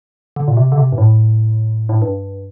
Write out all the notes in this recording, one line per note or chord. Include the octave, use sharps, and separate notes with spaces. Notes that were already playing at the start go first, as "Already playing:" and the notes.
D3
A#2
C3
D3
C3
G2
A2
A2
G2